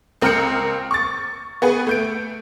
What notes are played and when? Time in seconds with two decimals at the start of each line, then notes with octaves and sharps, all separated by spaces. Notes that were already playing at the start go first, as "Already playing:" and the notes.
0.21 C#2 C4 A#4 F6 G6 C#7
0.91 C#6 A6
1.62 B3 G#4 B4
1.87 A3 G6 D7